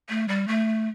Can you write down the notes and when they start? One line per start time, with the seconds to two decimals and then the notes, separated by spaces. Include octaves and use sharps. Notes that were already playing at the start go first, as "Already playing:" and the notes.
0.09 A3
0.28 G3
0.48 A3